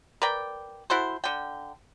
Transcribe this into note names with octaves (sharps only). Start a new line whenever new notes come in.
A#4 B4 D5 G5
E4 F#4 A4 C5
D3 G5